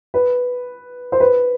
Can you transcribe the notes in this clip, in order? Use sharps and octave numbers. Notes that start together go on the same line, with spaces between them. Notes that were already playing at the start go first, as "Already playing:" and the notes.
B4
C5
B4